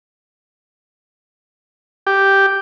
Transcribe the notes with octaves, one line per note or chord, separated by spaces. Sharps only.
G4